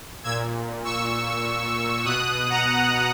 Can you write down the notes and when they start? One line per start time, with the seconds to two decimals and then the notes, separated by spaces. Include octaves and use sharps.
0.24 A#2 E6 G#6
0.84 C#6 E6
2.05 B2 D#6 F#6
2.50 F#5 A#5